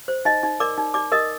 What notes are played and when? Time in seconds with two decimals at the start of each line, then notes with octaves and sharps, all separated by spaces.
0.08 C5
0.25 D#4 D#5
0.43 D#4
0.60 A#4 D5 D6
0.78 D#4
0.94 D#4 D5 D6
1.12 A#4 D#5 D#6